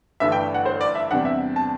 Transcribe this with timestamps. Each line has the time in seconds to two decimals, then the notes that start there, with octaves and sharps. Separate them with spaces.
0.20 G1 G2 E3 A3 D4 E5
0.32 G5
0.54 F#5
0.65 C5
0.81 D5
0.95 E5
1.11 E2 C3 G3 D4 F#5
1.25 E5
1.56 A5